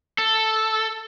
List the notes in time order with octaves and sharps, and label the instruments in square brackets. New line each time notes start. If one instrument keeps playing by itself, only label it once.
[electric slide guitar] A4